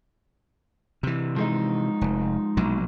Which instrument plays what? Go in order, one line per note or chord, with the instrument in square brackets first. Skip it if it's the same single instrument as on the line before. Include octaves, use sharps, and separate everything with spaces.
[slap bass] C3 E3
[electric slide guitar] F3 G#3 D#4
[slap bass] F1
A#1 B2 F#3